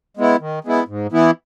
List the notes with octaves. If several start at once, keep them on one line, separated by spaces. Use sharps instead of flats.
G#3 B3 E4
D#3
G#3 B3 E4
G#2
E3 B3 E4